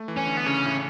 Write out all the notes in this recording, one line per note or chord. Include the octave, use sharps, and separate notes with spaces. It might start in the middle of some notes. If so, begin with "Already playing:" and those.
Already playing: A3
E3
C#4
D3
B3
C#3 C#4
A2